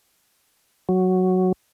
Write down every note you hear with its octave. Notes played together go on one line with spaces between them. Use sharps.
F#3